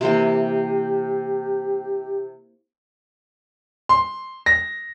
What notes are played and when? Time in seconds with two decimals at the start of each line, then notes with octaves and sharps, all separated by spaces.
0.01 C3 E3 A#3 G4
3.89 C6
4.46 A#6